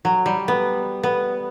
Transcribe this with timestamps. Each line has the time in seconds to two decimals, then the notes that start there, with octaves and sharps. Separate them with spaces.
0.05 F#3
0.26 G3
0.48 B3
1.03 B3